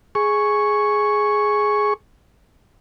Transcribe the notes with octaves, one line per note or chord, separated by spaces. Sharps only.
G#4 C#6